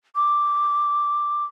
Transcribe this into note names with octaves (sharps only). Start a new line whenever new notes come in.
D6